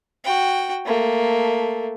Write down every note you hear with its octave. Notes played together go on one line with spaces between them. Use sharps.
F#4 G5
A3 A#3